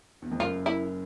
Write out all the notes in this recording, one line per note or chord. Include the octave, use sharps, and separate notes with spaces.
E2
F2
F#1 F#2 F4
E4